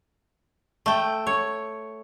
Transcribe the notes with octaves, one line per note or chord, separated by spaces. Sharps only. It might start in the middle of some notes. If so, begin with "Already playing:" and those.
A3 G5
C#5